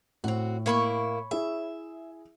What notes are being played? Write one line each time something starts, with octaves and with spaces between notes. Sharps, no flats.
A2 C4 F#4
A#3 E4 C#5 B5 C#6
E4 G#4 E5